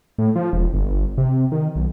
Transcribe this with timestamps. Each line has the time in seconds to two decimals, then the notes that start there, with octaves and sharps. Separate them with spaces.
0.18 A2
0.36 F3
0.53 E1
0.74 G1
1.18 C3
1.52 D#3
1.76 B1